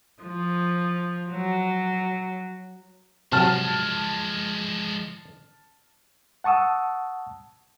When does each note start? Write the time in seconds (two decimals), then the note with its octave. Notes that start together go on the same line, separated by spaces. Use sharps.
0.22 F3
1.31 F#3
3.32 C3 F3 F#3 G#3 A5 F6
6.44 F#5 A5 C#6 D#6 E6